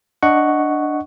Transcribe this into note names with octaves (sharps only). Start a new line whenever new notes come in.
D4 D#5 F#5 C#6